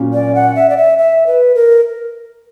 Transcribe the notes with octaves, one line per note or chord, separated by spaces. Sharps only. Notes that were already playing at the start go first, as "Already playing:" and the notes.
Already playing: A#2 F#3 C#4
D5
F#5
E5
D5
E5
E5
B4
A#4